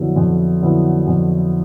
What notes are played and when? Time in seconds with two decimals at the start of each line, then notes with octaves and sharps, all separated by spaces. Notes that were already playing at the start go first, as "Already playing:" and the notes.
Already playing: F2 D3 F#3 B3 E4
0.16 F2
0.61 D3 F#3 B3 E4
1.07 F2